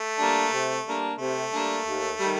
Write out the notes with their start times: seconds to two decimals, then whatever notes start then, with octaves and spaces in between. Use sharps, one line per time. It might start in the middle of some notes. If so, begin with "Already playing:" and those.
Already playing: A3
0.18 G3 A#3 D4
0.51 C3
0.85 G3 A#3 D4
1.19 C3 A3
1.52 G3 A#3 D4
1.85 D#2
2.19 D#3 G3